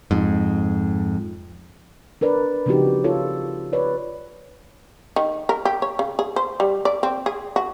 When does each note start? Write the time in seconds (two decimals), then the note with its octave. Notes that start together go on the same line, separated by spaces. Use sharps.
0.11 F2 G#2
2.21 D4 A#4 B4 D5
2.66 C#3 F3 C4 D#4 F#4 G4
3.04 F4 A4 C#5
3.73 B4 C#5 D5
5.16 D#3
5.49 A#4
5.65 G4
5.82 C#5
5.99 C#3
6.19 G#4
6.36 C5
6.60 G3
6.85 D5
7.03 C4
7.26 G#4
7.56 F#4